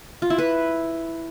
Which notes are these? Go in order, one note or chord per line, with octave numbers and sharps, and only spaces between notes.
F4
E4
B4